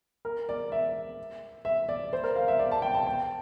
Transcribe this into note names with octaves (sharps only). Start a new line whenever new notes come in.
A#4
D5
E5
E5
D5
C5
A#4
F5
E5
D5
A5
G5
A5
G5